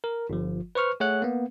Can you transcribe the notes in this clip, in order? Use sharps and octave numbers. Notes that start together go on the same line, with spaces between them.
A#4
G1 F3
B4 C5 C#6 F6
A3 G#4 C#5 F#5 F#6
A#3 B3